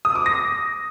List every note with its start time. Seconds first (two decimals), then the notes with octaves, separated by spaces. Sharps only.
0.05 D#6
0.15 D6
0.26 A#6